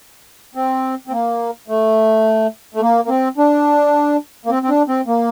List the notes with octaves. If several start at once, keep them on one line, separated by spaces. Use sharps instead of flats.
C4
C4
A#3
A3
A3
A#3
A#3
C4
D4
A#3
C4
C4
D4
C4
A#3